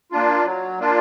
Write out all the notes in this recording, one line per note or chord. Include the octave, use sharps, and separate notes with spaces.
A#3 D4 F4
F#3
A#3 D4 F4